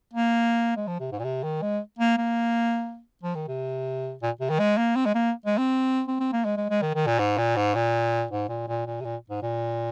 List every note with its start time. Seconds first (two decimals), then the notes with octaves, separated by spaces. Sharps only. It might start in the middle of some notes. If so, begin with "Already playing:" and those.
0.13 A#3
0.76 G#3
0.87 F3
1.00 C3
1.12 G#2
1.19 A#2
1.24 C3
1.43 D#3
1.62 G#3
1.99 A#3
2.18 A#3
3.23 F3
3.35 D#3
3.48 C3
4.22 A#2
4.41 C3
4.50 D#3
4.59 G#3
4.77 A#3
4.96 C4
5.06 G#3
5.15 A#3
5.46 G#3
5.58 C4
6.08 C4
6.20 C4
6.33 A#3
6.45 G#3
6.57 G#3
6.70 G#3
6.82 D#3
6.95 D#3
7.07 A#2
7.19 G#2
7.38 A#2
7.56 G#2
7.75 A#2
8.31 G#2
8.49 A#2
8.68 A#2
8.87 A#2
9.01 C3
9.05 A#2
9.30 G#2
9.42 A#2